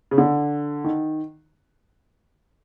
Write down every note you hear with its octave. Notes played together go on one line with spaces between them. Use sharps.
C#3
D3
D#3